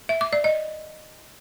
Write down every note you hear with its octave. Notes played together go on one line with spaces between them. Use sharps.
E5
D6
D5
D#5